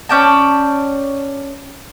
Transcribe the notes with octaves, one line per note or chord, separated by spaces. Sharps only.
C#4 D5 G5 A5